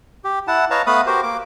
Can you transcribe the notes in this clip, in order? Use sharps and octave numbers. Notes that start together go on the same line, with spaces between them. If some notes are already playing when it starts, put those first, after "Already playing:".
G4
E4 F#5 A5
B4 C#5 D#5 F5 A5 A#5
A3 B3 B4 F5 B5 D#6
F#4 G4 A#4 C5
A#3 D6